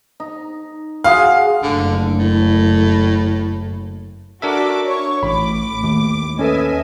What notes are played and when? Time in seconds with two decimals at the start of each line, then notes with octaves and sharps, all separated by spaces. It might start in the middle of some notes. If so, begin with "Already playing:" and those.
0.20 D#4
1.04 F4 F#4 G#4 F5
1.63 F#1 D3 A3
2.18 A2
4.42 D4 F#4 A4 A#4 E5 D6
4.85 C#5 C#6
5.23 A1 A2 B5 D6
5.83 D#2
6.39 C#4 A4 B4 D#5 E5 G#5